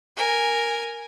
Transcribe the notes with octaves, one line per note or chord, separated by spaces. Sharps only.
A#4 G#5